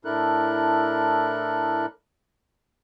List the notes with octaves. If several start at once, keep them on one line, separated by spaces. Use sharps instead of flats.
A2 D4 E4 A4 A#4 F#6